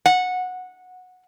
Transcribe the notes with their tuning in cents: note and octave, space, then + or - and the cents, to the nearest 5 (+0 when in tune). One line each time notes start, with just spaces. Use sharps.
F#5 -15